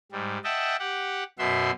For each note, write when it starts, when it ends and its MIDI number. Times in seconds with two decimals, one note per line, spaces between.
0.12 0.38 44
0.12 0.38 55
0.44 0.76 75
0.44 0.76 76
0.44 0.76 78
0.44 0.76 79
0.44 0.76 81
0.79 1.24 67
0.79 1.24 78
1.39 1.71 42
1.39 1.71 47
1.39 1.71 66
1.39 1.71 76
1.39 1.71 84